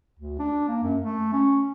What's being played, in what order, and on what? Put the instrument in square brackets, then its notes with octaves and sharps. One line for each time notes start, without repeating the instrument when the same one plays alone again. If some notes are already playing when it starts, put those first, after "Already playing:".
[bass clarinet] D2
D4
A#3
F#2
A3
C#4